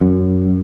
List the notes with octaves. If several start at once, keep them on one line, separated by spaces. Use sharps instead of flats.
F#2